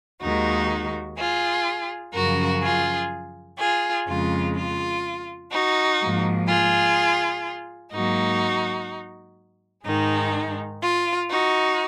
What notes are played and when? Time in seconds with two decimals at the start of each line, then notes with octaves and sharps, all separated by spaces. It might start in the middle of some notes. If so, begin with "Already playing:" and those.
0.21 D#2 D#3 G#3 D#4 F#4
1.17 F4 G#4
2.14 F#2 C#3 F3 F#4 A#4
2.62 F4 G#4
3.59 F4 G#4
4.07 F2 C#3 G#3 F4
4.55 F4
5.51 D#4 F#4
5.99 G#2 F3 A#3
6.47 F4 G#4
7.92 G#2 F#3 A#3 D#4 F#4
9.85 G#2 D#3 G#3 D#4
10.81 F4
11.30 D#4 F#4